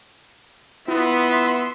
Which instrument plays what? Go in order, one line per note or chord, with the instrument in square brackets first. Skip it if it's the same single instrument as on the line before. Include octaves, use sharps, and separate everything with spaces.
[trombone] B3 [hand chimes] E4 F4 [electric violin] E5 C6